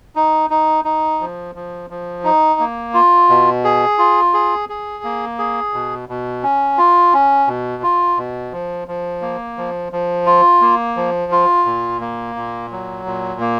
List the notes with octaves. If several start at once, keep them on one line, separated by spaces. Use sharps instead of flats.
D#4
D#4
D#4
F3
F3
F3
D#4
A#3
F4
B2
G#4
F4
G#4
G#4
A#3
G#4
B2
B2
C#4
F4
C#4
B2
F4
B2
F3
F3
A#3
F3
F3
F4
A#3
F3
F4
A#2
A#3
A#2
F#3
A#2
A#3